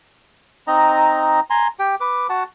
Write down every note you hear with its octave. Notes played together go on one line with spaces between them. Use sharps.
C4 D#4 D#5 A#5
G#5 A#5 C6
G4 G5
B4 D6
F#4 F#5 A5